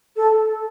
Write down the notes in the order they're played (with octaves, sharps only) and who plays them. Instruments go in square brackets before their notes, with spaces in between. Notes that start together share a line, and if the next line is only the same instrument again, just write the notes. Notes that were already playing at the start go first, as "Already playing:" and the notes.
[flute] A4